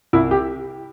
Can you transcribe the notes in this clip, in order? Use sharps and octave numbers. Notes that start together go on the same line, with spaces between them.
C2 E4
G4